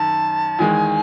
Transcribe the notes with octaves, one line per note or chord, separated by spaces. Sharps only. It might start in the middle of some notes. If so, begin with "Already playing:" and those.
Already playing: F#2 D#3 A5
E2 D#3 G#3 G#5